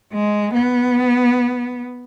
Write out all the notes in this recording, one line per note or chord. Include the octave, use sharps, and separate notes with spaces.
G#3
B3